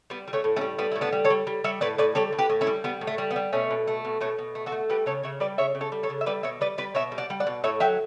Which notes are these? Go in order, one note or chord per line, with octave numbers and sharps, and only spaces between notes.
G3 B3
G3
A3 C#4
A2
A3 C#4
G3
G3 B3
A2 E4
B3 D4
G3
A4 C#5
G3
G3
G3 C#5 E5
A2 B4 D5
A2 B4 D5
G3 A4 C#5
A2
G4 B4
A2
C#4 E4
G3
G3 B3
A2
A3
G3
B3
G3
B2 A3 C#4
B2
A3
B2
B2 A3 C#4
B2
A3
F#4 A4
A3
G3 G4 B4
C#3 A4 C#5
C#3 C#5 E5
G3 B4 D5
C#3 C#5 E5
C#3
A4 C#5
G3
A4 C#5
C#3
E5
G3 B4 D5
B2 C#5 E5
G3 B4 D5
G3 B4 D5
B2 C#5 E5
G3
D5 F#5
G3
D5 F#5
B2
A2 C#5 E5
F#3 E5 G5